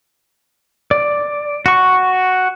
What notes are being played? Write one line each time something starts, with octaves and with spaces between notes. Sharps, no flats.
D5
F#4 C#6